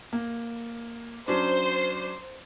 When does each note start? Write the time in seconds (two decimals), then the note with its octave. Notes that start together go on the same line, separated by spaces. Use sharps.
0.13 A#3
1.28 F#3 C#4 D4 C5